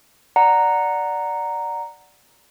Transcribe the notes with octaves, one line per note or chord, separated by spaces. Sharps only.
D5 F#5 A#5